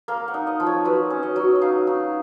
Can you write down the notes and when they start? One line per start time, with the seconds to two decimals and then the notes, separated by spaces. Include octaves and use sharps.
0.08 A#3 F5
0.28 F#5
0.34 D#4
0.47 D#5
0.60 F3
0.66 C#5
0.85 F#3 B4
1.10 C#4
1.23 D#5
1.36 F#3
1.55 D#5
1.62 D#4 F5
1.87 D#4